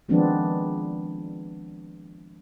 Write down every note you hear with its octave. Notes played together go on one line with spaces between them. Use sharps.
D#3 F3 G#3 B3 C4 D4